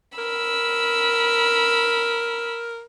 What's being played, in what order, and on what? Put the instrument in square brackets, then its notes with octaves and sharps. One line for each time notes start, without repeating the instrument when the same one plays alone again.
[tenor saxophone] A#4 [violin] B5 E6